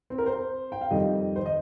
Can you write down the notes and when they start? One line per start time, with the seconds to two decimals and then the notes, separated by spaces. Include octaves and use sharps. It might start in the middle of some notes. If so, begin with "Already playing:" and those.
0.10 C4
0.18 A#4
0.26 C5
0.72 G5
0.81 F5
0.90 F2 D#3 G3 D#5
1.36 C5
1.46 D#5